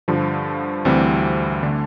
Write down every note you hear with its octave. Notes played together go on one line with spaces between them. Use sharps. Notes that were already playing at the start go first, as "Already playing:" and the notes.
G2 D3 F3
D2 C3 E3 G3 C4
D3 A3 D4